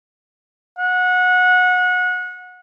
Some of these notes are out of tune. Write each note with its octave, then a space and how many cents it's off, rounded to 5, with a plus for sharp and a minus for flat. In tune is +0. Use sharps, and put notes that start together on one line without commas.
F#5 -25